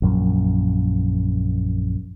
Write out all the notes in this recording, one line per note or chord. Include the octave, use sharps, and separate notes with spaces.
A#1 F#2